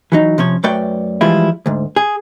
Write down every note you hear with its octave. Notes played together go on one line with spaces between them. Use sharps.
E3 F#3 D#4
C3 F3 C#4 C#5
F#2 A3 B4 C#5 D5 G5
E3 F3 G3 G#3 E4 F4
D2 G#2
G#4